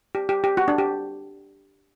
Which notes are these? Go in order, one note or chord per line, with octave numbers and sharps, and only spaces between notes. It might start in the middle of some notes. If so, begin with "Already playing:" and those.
G4
G4
G4
F#4
D4
G4